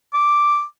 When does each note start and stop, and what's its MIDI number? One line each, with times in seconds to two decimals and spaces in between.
0.13 0.63 86